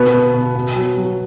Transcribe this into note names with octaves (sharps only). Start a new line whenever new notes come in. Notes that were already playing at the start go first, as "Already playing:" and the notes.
Already playing: B2 B3
B2
B2
B2
F#3
F#3